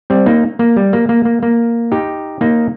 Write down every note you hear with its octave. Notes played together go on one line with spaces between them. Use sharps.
G3 C4
A#3 D#4
A#3
G3
A#3
A#3
A#3
A#3
D#4 G4
A#3 D#4